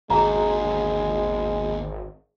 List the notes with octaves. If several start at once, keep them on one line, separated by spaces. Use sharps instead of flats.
G#1 D#2 G#3 F#4 G#4 A#5